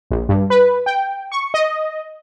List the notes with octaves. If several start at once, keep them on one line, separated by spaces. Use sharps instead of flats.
A#1
G2
B4
G5
C#6
D#5